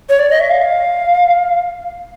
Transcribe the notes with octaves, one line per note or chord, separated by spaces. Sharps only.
C#5
D5
D#5
E5
F5